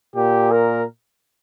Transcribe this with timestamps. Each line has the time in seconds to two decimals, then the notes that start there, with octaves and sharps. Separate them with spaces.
0.16 A#2 G4
0.52 A#4